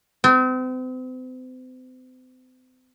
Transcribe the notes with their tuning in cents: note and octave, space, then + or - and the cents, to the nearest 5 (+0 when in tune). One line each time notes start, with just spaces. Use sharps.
C4 -40